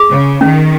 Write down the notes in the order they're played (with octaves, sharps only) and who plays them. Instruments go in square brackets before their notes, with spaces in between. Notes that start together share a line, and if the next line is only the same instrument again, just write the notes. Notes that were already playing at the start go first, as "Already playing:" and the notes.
Already playing: [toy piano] G#4
[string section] C#3
[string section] D#3 [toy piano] C#4